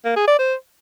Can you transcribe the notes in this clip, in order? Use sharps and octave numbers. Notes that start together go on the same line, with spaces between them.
A#3
G#4
D5
C5